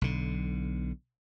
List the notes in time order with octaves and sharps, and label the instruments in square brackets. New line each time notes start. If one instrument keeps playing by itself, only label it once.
[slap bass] B1 D3